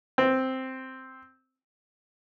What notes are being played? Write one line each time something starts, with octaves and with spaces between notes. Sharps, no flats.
C4